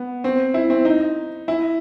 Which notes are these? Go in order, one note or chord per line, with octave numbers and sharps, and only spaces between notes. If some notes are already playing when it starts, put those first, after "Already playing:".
Already playing: B3
C4
E4
C4
D#4
E4